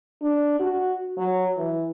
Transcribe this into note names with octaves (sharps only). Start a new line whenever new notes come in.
D4
F#4
F#3
E3